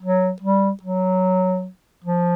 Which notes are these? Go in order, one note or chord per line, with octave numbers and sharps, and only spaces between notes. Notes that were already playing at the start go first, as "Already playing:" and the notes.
F#3
G3
F#3
F3